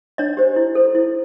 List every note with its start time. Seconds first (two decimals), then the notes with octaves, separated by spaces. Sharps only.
0.18 D4 C#5 D#5
0.37 G4 C5
0.56 E4
0.75 A4 C5
0.95 E4